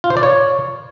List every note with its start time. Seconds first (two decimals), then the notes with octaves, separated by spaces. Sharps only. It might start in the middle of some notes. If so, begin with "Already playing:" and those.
0.04 F4
0.10 C5
0.17 D5
0.23 C#5